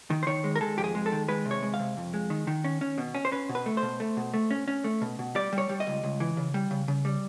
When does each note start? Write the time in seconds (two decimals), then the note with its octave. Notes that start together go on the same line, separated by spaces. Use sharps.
0.10 D#3
0.23 C5
0.27 D#3 C#5
0.44 G#3
0.56 A#4
0.61 G#3 A4
0.78 F2 G4
0.84 G#4
0.95 G#3
1.06 A4
1.12 D#3
1.28 G#3 B4
1.46 C3
1.51 C#5
1.63 G#3
1.74 F5
1.79 C3
1.97 F2
2.14 G#3
2.30 D#3
2.47 D#3
2.64 C#4
2.81 C#4
2.98 B2
3.15 C#4
3.25 C5
3.32 C#4 B4
3.49 B2
3.55 B4
3.66 A3
3.77 C5
3.83 B2
4.00 A3
4.17 B2
4.34 A3
4.51 C#4
4.68 C#4
4.84 A3
5.02 B2
5.19 B2
5.35 G3 D5
5.53 G3
5.58 C#5
5.69 G3
5.80 D#5
5.87 C#2
6.03 C#2
6.20 E3
6.37 C#3
6.54 G3
6.71 C#3
6.88 C#3
7.05 G3